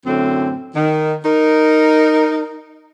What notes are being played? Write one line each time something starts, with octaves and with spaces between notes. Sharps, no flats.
F#2 A2 D3 C4
D#3
D#4 A#4